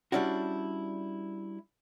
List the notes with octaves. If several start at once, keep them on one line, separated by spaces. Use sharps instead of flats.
G3 C#4 D4 E4 F#4